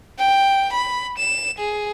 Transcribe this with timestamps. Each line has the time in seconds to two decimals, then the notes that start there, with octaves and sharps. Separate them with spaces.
0.19 G5
0.73 B5
1.18 E7
1.59 G#4